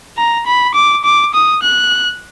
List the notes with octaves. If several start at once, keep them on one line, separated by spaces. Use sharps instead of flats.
A#5
B5
D6
D6
D#6
F#6